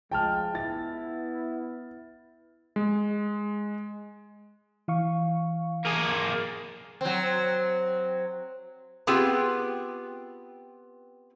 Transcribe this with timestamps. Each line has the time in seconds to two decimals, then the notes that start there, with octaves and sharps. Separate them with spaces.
0.12 F3 G#3 G5 A5 F6
0.55 B3 E4 A6
2.76 G#3
4.88 E3 F5 C#6
5.85 A#3 G#4
7.01 F#3 C4
9.07 B3 C4 F4 G4 G#4 B4